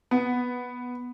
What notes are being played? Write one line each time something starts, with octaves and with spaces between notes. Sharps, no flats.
B3